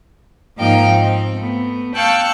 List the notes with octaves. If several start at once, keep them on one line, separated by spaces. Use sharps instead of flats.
G#2 F3 A#3 D#4 F5 G5
C4
A3 B3
F5 G5 A5 C#6 E6 F#6